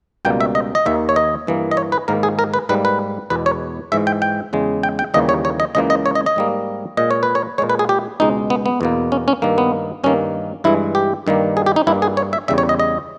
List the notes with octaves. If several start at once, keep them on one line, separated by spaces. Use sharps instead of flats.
C#2 B2 G3 A#3 G5
E5
D#5
D#5
D#2 D#3 A#3 E5
C#5
D#5
G2 E3 A#3
D#5
C#5
B4
G#2 D#3 A#3 A#4
G#4
A#4
B4
G#2 G3 A#3 B4
B4
E2 B2 G#3 B4
C#5
G#2 E3 G#3 E5
G5
G5
E2 C#3 G#3
G5
G5
D#2 C#3 E3 G3 A#3 D#5
C#5
C#5
D#5
C#2 C#3 E3 A#3 D#5
D#5
C#5
D#5
D#5
G#2 G3 A#3
A#2 G#3 D#5
C#5
B4
C#5
A#2 G#3 C#5
B4
G#4
G4
C#2 B2 G#3 D#4
B3
B3
E2 B2 A#3
C#4
C#4
G2 D#3 A#3
B3
G2 D#3 A#3 C#4
G2 E3 G#3 E4
G4
G2 D#3 G3 A#3
G#4
G4
D#4
G2 G3 A#3 E4
G#4
C#5
E5
E2 C#3 G3 E5
C#5
D#5
D#5